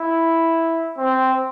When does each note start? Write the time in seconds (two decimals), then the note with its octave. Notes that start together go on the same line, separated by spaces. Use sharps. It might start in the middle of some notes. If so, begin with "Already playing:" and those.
Already playing: E4
0.98 C4